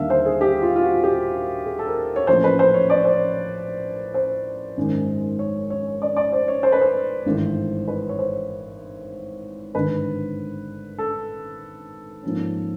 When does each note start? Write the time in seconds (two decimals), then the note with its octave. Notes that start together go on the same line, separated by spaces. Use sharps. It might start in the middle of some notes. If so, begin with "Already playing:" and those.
Already playing: D#2 D3 G3 A#3 D4 E5 F5
0.10 C5
0.26 G#4
0.41 G4
0.62 F4
0.76 F4
0.83 F#4
1.04 G4
1.66 G#4
1.79 A4
1.86 A#4
2.16 C#5
2.27 A1 A2 F3 A#3 C#4 C5
2.44 B4
2.59 C5
2.74 C#5
2.90 D5
2.97 C#5
3.05 C5
3.13 C#5
4.14 C5
4.77 G#1 F#2 D#3 G#3
5.39 C#5
5.70 C#5
6.02 D5
6.17 D5
6.33 C5
6.48 C#5
6.63 C5
6.72 B4
6.81 C5
7.26 G#1 G2 E3 A3
7.88 B4
8.09 C#5
8.19 C5
9.75 G#1 G2 D3 B4
10.98 A4
12.23 G#2 F3 A#3 C#4